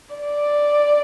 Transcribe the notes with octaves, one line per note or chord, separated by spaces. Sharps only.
D5